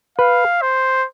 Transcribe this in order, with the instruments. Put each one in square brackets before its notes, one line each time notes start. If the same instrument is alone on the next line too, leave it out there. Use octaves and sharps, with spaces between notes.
[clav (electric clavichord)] B4 [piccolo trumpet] F5
[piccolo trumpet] C5